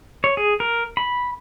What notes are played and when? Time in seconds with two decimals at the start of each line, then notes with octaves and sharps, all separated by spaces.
0.24 C#5
0.37 G#4
0.60 A#4
0.97 B5